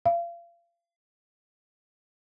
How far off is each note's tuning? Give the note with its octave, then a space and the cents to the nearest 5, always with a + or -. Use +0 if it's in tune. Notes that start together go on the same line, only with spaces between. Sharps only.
F5 -35